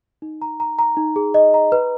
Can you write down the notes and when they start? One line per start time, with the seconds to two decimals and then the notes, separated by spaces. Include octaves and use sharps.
0.22 D#4
0.42 A#5
0.60 A#5
0.79 A#5
0.97 D#4
1.16 G#4
1.34 D#5
1.54 A#5
1.72 B4